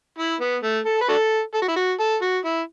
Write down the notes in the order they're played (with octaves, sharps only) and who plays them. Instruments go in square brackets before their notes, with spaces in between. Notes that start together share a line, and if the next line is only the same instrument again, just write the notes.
[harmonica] E4
B3
A3
A4
B4
D4 F#4 A4
A4
F#4
E4
F#4
A4
F#4
E4